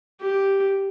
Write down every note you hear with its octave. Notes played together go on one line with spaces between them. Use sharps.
G4